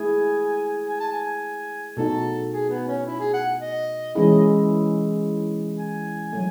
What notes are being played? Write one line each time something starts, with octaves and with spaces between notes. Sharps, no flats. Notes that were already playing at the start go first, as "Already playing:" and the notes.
Already playing: A3 E4 G#4 G#5
G#5
A5
G#5
B2 A3 D#4 F#4 A4
G#4
B3
C#4
E4
G#4
F#5
D#5
E3 G#3 C#4 E4 G#4
G#5
F#3 A3